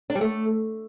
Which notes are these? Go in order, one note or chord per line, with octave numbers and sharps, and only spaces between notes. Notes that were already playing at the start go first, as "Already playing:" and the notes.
D4
G3
A3